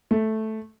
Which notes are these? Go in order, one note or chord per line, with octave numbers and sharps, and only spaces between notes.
A3